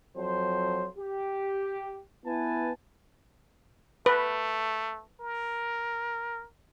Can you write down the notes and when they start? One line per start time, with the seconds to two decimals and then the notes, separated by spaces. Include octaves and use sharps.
0.17 F2 F#3 C5
0.97 G4
2.26 B3 E4 B4 G#5 A5
4.06 A3 B4
5.21 A#4